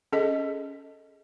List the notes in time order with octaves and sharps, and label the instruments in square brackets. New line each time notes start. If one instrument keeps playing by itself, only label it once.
[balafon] C#4 G#4 A4 D#5